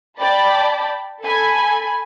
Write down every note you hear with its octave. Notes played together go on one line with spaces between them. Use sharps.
D5 G5 A5 B5
A4 G#5 B5